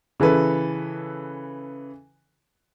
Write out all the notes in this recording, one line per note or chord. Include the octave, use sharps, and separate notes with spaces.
C#3 E3 A4 B4